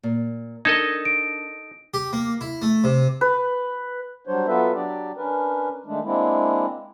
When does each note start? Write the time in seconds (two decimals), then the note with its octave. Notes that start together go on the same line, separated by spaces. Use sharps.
0.03 A#2
0.65 D4 D#4 A4 A#4 D#5 G#6
1.05 D7
1.94 G4
2.13 A#3
2.41 E4
2.62 A3
2.84 C3
3.21 B4
4.27 F#3 G3 D4 C5 C#5
4.47 F#3 B3 F4 A4 B4 E5
4.74 F#3 D4 G4 D5
5.17 C#4 D4 A#4 B4
5.86 D#3 G#3 A3 D4
6.04 G#3 A#3 C4 D4 E4